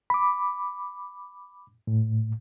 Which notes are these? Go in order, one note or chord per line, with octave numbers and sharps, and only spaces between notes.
B5 D6
A2